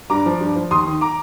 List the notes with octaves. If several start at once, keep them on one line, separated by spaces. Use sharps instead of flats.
G2 A#5 D6
F3
G2
F3
D#2 C6 D#6
D#3
A#5 D6